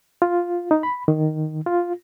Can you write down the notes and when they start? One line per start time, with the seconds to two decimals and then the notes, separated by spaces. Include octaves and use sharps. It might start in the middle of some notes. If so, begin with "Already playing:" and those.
0.22 F4
0.71 D#4
0.83 B5
1.08 D#3
1.66 F4